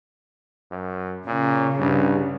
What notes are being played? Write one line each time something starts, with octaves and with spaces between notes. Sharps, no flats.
F#2
A#2 C#3
C2 G2